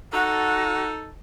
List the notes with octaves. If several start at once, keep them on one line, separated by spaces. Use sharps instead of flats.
D#4 F#4 A4